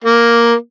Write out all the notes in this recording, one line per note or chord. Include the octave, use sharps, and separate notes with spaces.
A#3